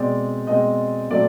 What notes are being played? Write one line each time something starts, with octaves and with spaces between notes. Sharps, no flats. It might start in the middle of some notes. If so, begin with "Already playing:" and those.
Already playing: B2 G#3 C4 D5
B2 G#3 C4 D#5
A#2 F#3 A3 C4 D5